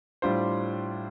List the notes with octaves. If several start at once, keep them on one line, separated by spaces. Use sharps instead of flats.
A2 G3 D4 F4 C5